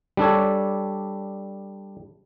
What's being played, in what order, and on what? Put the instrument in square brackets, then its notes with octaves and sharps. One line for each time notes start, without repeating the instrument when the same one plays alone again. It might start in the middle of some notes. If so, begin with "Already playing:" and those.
[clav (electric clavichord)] G3 D4 A4 C#5